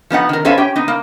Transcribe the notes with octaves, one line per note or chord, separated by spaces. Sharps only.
F3 B3 D#4 F#5
D#3 A#4
C#4 A4 B4 C5 E5 F5
C#4 G4 G5
B3 D#4
A#3